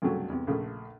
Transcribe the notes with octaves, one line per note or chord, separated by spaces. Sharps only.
C2 G2 C#3 F#3 A3
E2 C3
A#1 C#3 A3